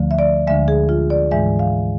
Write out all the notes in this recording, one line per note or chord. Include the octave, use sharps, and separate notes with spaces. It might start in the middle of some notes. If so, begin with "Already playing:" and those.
Already playing: D2 D3 F3 A3
E5
D5
D2 D3 G#3 E5
G#4
F4
D5
G#2 E3 G#3 E5
F5